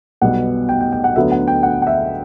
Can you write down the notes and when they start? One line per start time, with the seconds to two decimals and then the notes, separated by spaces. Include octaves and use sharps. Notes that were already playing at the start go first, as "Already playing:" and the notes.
0.21 B1 B2 G3 B3 F#5
0.69 G5
0.81 G5
0.92 G5
1.04 F#5
1.16 D2 D3 F#3 B3 E5
1.32 F#5
1.47 G5
1.63 F#5
1.82 F#5
1.87 E5